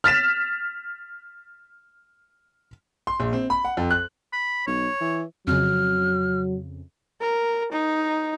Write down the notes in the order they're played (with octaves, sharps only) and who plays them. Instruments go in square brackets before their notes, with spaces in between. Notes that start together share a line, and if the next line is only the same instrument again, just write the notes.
[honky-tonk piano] F6 A6 B6 E7
[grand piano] C6
A#1
C4
B5
F#5
F2
F#6
[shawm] B5
[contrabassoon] B1 [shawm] C#5
[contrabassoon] E3
[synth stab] F2 C#3 [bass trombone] F#3 [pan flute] F6
[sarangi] A#4
D#4